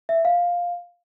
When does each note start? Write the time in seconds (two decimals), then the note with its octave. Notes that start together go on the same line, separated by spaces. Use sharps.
0.09 E5
0.25 F5